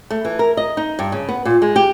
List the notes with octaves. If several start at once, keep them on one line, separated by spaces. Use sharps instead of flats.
A3
E3
A#4
D#5
D#4
G2
C#3
B3
A#2
G#3
G4